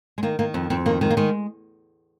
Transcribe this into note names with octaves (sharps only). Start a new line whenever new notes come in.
G#3
D#3 A#3
D#3 A#3
F2
F2 C4
D#3 A#3
D#3 G#3
A#3
D#3 G#3